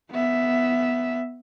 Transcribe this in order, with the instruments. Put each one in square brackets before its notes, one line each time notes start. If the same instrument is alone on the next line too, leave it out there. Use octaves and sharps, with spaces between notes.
[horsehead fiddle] B3 E5